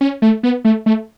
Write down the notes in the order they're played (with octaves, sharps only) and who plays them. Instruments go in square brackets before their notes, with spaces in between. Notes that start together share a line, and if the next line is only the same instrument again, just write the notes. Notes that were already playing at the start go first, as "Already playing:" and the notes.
[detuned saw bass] C#4
A3
B3
A3
A3